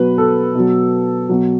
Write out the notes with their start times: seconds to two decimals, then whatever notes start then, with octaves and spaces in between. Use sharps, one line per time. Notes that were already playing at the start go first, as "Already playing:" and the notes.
Already playing: B2 F#3 B4
0.18 A4
0.55 B2 F#3
1.29 B2 F#3